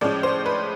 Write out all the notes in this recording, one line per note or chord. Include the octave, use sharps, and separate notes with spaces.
A2 F3 G#3 C#4 D5
C5
B4